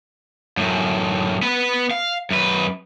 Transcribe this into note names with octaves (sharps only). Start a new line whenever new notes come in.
F#2 A2
B3 B4
F5
F#2 B4